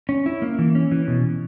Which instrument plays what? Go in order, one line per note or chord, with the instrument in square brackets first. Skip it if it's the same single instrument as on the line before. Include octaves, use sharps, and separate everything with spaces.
[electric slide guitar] C#4
E4
A#3
E3
C#4
E3
B2